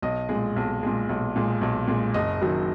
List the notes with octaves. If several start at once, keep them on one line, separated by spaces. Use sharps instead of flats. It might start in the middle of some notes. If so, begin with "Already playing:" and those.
B1 D#5
A#2 G#3
B1
A#2 G#3
B1
A#2 G#3
B1
A#2 G#3
F#1 D#5
F#2 D#3 F#3